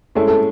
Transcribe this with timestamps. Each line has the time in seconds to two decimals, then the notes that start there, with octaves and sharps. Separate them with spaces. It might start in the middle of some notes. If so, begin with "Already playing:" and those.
0.15 A2 G#3 C#4 E4 A4
0.28 A4